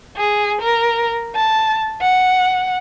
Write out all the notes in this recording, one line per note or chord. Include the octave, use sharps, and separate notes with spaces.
G#4
A#4
A5
F#5